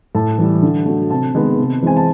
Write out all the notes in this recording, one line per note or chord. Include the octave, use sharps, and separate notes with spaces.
A2 A5
E3 G3
D3
F#3 A3
C3 A5
D#3 G#3 B3
C3
E3 G#3 C4 G#5
A5